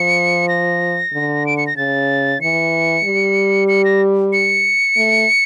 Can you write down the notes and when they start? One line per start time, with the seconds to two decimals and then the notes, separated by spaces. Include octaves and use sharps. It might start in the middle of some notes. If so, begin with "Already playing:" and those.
Already playing: F3 C#7
0.49 A#6
1.13 D3
1.47 D7
1.57 C#7
1.67 A#6
1.77 C#3 A6
2.41 E3 C#7
3.04 G3
3.68 C#7
3.85 A#6
4.33 C#7
4.97 A3